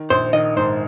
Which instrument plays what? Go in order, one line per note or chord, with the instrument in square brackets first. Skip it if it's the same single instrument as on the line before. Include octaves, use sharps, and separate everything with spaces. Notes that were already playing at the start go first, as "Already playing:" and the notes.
Already playing: [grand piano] D#3
[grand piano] A#1 [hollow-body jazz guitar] C5
[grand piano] D#3 [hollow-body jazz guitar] D#5
[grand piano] G#2 [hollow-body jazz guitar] C5